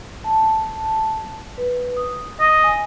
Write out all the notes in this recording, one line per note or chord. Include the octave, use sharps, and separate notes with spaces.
A5
B4
D#6
D#5
G#5